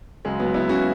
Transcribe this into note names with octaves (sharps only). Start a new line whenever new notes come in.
C#2 C#3 F#3 G#3
F#3 B3
B3 E4
C#3 F#3 C#4 F#4